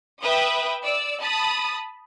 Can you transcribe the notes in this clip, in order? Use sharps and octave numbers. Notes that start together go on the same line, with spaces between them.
B4 E5 G5 D#6
D5 E6
A5 B5 D#6